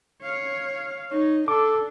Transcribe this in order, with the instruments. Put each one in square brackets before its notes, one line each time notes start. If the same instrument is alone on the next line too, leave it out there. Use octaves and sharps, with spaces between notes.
[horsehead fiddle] C#5 F5
[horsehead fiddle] D#4 [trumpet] C#5
[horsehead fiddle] D4 [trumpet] A4 [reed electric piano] D6